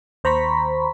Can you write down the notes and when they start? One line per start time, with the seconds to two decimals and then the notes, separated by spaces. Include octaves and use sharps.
0.24 D#2 C5 A#5 B5 C#6 B6